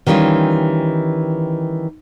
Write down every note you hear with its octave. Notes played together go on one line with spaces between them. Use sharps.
D#3 E3 G3 C#4 F4